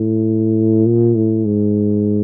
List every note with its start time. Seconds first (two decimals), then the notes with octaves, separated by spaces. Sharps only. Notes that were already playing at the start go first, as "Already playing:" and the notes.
Already playing: A2
0.86 A#2
1.15 A2
1.45 G#2